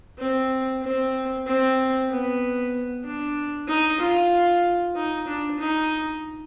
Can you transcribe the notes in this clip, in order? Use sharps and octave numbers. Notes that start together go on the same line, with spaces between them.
C4
C4
C4
B3
D4
D#4
F4
D#4
D4
D#4